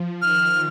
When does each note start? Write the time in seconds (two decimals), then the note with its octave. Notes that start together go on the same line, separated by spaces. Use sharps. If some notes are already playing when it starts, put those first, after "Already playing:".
Already playing: F3
0.21 D#3 F6